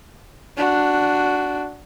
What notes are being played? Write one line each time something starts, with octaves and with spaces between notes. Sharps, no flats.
D4 F#4